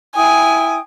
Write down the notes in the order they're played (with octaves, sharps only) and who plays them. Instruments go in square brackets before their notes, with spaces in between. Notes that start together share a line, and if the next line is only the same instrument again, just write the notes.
[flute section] E4 G5 D#6 [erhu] G#5